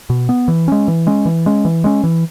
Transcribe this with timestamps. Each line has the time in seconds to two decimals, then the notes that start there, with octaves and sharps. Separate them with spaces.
0.10 B2
0.29 B3
0.48 E3
0.68 G#3 C#4
0.88 E3
1.07 G#3 C#4
1.26 E3
1.46 G#3 C#4
1.65 E3
1.84 G#3 C#4
2.04 E3